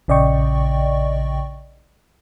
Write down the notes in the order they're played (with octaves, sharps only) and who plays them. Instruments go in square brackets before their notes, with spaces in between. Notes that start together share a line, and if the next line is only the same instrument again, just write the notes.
[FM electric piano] A#1 C#3 D5 D#5 G5 C#6